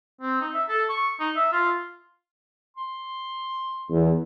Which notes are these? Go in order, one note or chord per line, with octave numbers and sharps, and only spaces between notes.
C4
D#4
E5
A4
C#6
D#4
E5
F4
C6
E2